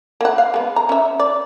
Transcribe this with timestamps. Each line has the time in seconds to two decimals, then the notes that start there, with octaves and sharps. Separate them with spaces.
0.21 A#3 F#5
0.38 F5
0.54 G#3 B3
0.76 A#5
0.89 C#4 E5
1.19 D5